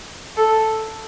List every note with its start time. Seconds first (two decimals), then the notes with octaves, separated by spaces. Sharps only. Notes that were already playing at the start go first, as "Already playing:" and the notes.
0.37 A4